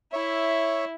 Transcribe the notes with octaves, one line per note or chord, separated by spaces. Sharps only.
E4 C#5 E5